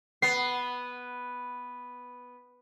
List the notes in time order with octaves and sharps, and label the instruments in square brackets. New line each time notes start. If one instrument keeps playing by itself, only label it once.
[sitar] B3 [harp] C7